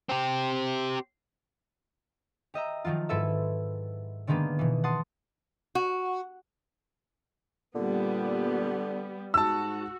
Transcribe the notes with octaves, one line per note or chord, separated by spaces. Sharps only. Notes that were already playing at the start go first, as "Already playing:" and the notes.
C4 G4
G4 D#5 E5 A#5
D#3 F3 F#3 F4
G#2 E4 A4 B4 E5
D3 D#3 G#3 A#3 B3 D4
B2 E3
F#5 A5 C6 D#6
F#4
A#2 D3 G3 B3
G#2 F#4 A5 E6